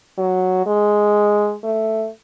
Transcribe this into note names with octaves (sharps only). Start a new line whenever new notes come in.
F#3
G#3
A3